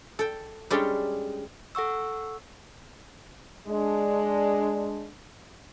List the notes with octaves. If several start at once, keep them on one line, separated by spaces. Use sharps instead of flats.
A4 G5
G3 G#3 C#4 D4 G4 A4
A4 F#5 C#6 E6
G#3 D4